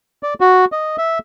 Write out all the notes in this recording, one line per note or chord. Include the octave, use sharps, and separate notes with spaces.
D5
F#4
D#5
E5